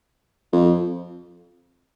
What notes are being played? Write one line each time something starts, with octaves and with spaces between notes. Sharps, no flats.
F2